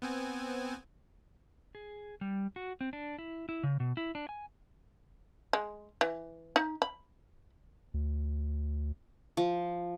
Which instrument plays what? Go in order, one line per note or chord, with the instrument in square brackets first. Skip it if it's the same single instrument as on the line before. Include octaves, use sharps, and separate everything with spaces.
[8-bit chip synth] B3 C4 G#5
[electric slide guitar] G#4
G3
F#4
C4
D4
E4
E4
C#3
B2
E4
D4
G#5
[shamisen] G#3
E3
D#4
B5
[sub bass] D2
[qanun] F3